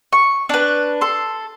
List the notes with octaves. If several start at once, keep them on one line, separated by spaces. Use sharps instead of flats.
C#6
D4 B4
A4 C6